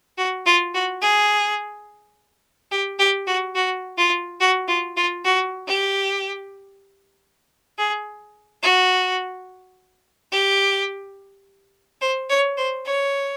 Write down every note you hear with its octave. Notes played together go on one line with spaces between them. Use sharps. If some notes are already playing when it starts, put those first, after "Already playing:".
F#4
F4
F#4
G#4
G4
G4
F#4
F#4
F4
F#4
F4
F4
F#4
G4
G#4
F#4
G4
C5
C#5
C5
C#5